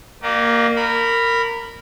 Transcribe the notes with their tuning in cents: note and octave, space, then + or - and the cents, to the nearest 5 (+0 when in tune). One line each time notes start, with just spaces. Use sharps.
A#3 +0 G4 -45 D5 +40
A#4 -15 B5 +0